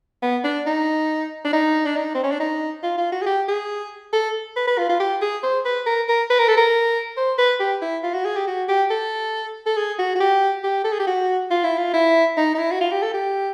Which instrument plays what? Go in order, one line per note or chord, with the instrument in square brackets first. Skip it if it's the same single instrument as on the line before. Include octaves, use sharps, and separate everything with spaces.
[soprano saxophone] B3
D4
D#4
D4
D#4
D4
D#4
C4
C#4
D4
D#4
F4
F4
F#4
G#4
G4
G#4
A4
B4
B4
F4
F4
G4
G#4
C5
B4
A#4
A#4
B4
A#4
A4
A#4
C5
B4
G4
E4
F4
F#4
G#4
G4
F#4
G4
A4
A4
G#4
F#4
F#4
G4
G4
A4
G#4
G4
F#4
F4
E4
F4
E4
D#4
D#4
E4
F#4
F4
G4
A4
G4